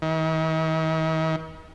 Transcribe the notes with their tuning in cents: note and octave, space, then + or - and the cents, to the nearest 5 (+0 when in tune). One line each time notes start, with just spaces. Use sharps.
D#3 +45